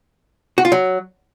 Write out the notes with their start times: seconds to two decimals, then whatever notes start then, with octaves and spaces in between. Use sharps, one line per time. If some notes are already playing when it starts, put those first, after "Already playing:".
0.58 F#4
0.65 F4
0.72 F#3